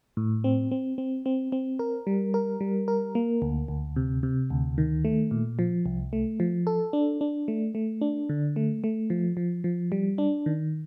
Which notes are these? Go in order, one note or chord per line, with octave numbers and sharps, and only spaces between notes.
A2
C4
C4
C4
C4
C4
A#4
G3
A#4
G3
A#4
A#3
D2
D2
C3
C3
D2
D#3
A3
A#2
F3
C2
A3
F3
A4
D4
D4
A3
A3
D4
D3
A3
A3
F3
F3
F3
G3
D4
D#3